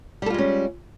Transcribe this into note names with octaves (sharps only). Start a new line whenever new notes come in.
G3 G#3 C#4 F4 A4